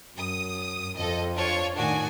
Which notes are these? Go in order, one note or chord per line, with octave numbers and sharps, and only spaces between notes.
F#2 D#6
F2 A4 D#5
D4 F4 C#5
A2 D#3 D4 F#4 G#5